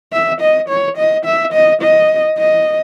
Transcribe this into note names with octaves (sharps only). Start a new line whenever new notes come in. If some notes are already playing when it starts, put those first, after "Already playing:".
E5
D#5
C#5
D#5
E5
D#5
D#5
D#5